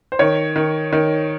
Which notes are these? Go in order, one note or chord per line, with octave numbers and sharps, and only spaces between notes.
C5
D#3 C#5
D#3
D#3